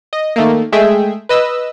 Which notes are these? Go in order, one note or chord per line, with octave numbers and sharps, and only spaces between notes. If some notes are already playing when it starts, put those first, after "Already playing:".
D#5
D#3 A3 A#3
G#3 A3 G#4 E5 G5
B4 D#5 E6